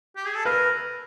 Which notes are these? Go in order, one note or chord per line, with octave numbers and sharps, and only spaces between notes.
G4
G#4
A4
A#4 B4